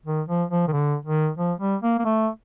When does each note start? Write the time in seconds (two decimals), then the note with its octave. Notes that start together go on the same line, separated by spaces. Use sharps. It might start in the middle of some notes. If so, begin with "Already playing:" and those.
0.06 D#3
0.28 F3
0.51 F3
0.68 D#3
0.73 D3
1.06 D#3
1.38 F3
1.61 G3
1.83 A#3
1.99 A#3
2.05 A3